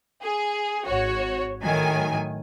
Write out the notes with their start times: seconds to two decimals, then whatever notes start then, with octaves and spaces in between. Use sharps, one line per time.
0.22 G#4
0.85 G#1 F#4 C#5
1.63 A2 D#3 F#3 G#5